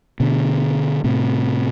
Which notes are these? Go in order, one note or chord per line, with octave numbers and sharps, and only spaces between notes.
B2 D3
A2 C3